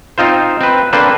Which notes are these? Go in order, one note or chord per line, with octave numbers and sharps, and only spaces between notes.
C4 D#4 F4 C5
C4 B4
A#3 C4 D4 A4 B4 C5